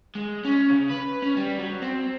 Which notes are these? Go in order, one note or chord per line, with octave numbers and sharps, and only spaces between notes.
G#3
C#4
C#3
B4
C#4
G3
F#3
C4